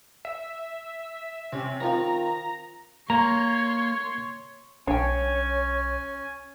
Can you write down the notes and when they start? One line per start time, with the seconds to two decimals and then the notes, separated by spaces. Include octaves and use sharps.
0.25 E5
1.52 C3 C4 C#4
1.80 D#3 F3 C4 A#5
3.10 A#3 C#5 A#5 C6
4.87 B1 C#4 D4 C#5 G5 G#5